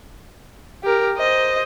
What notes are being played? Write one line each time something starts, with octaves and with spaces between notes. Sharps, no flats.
G4 A#4
C5 D#5